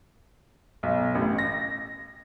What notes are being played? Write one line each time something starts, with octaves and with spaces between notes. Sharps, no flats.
B1
A1
A#6